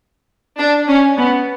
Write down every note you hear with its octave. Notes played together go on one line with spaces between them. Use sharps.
D4
C#4
B3